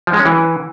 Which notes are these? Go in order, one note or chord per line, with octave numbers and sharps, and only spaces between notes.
F3
G#3
C#4
E3